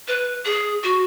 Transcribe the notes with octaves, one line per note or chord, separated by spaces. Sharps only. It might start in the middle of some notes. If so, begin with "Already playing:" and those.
B4
G#4
F#4